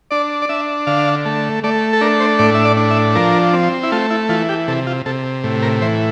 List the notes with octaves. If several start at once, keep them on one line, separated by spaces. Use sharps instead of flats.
D4 D5
D5
D4 E5
D3 F5
A3
A3 D5
A4
D4 A#4
C5
A2 D5
E5
D5
D4
E5
F3 A#4
C4
E4
A3 F4
E4
E3 F4
G4
C3 A4
F4
C3 A4
A2
A#4
E3 C5